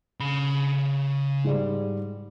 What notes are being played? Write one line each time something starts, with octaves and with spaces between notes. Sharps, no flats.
C#3 B5
G#2 G3